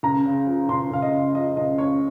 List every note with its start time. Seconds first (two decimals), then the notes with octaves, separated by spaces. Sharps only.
0.03 C#2 A#5
0.26 C#3
0.47 F3
0.69 C#2 C6
0.91 C#2 F5
1.02 D#5
1.13 C#3
1.35 F3 D#5
1.57 C#2 D#5
1.78 C#2 C#5